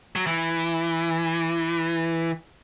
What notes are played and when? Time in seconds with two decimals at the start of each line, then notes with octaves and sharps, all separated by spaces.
0.16 F#3
0.27 E3